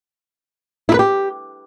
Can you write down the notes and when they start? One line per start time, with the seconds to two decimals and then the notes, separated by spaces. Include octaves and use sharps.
0.89 E4
0.94 B4
0.99 G4